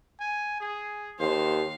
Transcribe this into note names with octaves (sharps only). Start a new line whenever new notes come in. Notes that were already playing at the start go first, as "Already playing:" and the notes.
G#5
G#4
D#2 C5 F5